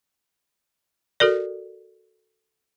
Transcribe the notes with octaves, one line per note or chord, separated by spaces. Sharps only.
F#4 A4 A#4 D5